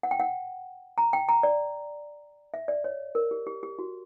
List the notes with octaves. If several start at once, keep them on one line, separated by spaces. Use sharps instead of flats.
F#5
G5
F#5
A#5
G5
A#5
D5
E5
D5
C#5
A#4
G4
G4
G4
F#4